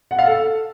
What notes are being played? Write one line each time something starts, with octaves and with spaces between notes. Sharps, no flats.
F#5
F5
A4